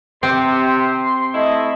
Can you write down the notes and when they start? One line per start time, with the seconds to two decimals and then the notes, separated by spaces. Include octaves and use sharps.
0.23 C3 C4 C6
1.33 A3 E4 D#5